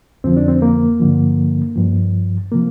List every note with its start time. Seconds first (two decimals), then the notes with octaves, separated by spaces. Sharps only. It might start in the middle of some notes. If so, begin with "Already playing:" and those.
0.24 F2 D3 F3 C4
0.37 D4
0.48 C4
0.62 A#3
1.00 G2 D3 F3
1.76 G2 F3
2.52 C3 F3 A#3